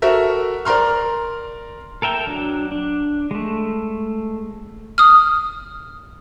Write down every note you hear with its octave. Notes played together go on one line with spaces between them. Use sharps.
F#4 A4 A#4 E5
A#4 D5 A#5 C6 F6
A4 A#4 E5 G5
F#3 D4
D4
G#3 A3
D#6 F6